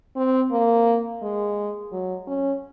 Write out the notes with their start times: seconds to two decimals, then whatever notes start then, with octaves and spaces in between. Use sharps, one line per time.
0.16 C4
0.51 A#3
1.22 G#3
1.92 F#3
2.27 C#4